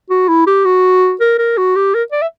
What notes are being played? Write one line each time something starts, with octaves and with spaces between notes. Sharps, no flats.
F#4
E4
G4
F#4
A#4
A#4
F#4
G4
A#4
D5
E5